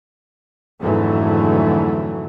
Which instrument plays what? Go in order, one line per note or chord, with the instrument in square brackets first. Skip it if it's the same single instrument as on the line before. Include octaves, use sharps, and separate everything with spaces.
[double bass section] F2 G#2 D3 E3 F#3 A3